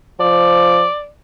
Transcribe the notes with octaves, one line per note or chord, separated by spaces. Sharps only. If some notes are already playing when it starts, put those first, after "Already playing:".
F3 D5